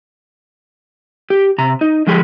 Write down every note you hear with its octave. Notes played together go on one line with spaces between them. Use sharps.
G4
C3 A#5
D#4
D3 F3 G#3 G4 G#4